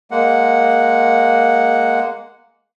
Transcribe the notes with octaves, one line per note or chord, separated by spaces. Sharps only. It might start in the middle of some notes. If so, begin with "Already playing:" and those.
G#3 A#3 F#5